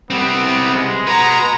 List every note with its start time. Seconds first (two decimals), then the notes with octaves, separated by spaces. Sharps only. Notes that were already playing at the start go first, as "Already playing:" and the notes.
0.10 G3 B3 C4
0.76 G#3
1.07 F#4 B4 A#5